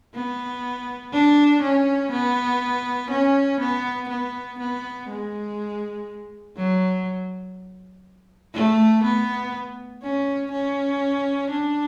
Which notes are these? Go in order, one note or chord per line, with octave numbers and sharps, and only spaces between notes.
B3
D4
C#4
B3
C#4
B3
B3
B3
G#3
F#3
A3
B3
C#4
C#4
D4